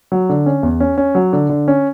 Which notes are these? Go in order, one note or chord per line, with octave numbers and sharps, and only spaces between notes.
F#3
D3
C#4
E2
C#4
C#4
F#3
D3
D3
C#4